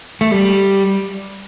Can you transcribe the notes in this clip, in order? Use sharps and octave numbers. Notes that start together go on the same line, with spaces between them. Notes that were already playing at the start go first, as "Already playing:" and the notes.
A3
G3